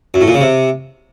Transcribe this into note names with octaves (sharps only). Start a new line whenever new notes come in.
F#2
A2
A#2
C#3
C3